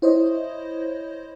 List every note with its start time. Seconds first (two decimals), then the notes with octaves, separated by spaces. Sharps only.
0.02 E4 C5 C#5 D#5